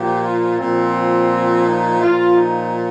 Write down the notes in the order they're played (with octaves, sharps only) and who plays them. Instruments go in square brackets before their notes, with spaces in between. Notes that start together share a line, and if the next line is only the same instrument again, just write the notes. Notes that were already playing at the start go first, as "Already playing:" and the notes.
Already playing: [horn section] A#2 F3 G4
F4
A#2 F3 C4
D#4
A#2 F3 F4
D#4